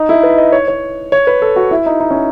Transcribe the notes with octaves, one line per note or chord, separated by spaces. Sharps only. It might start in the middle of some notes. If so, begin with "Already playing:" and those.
Already playing: D#4
E4
B4
D#5
C#5
C#5
C#5
B4
A4
F#4
E4
D#4
D#4
C#4